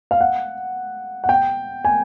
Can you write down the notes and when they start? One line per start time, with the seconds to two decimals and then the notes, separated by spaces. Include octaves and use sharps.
0.11 F5
0.21 F#5
1.24 F#5
1.29 G5
1.85 G#5